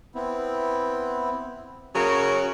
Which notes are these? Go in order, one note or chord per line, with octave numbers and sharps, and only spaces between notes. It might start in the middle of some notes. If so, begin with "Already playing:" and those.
B3 C4 E4
C#3 F#3 C#4 A#4 F#5 C#6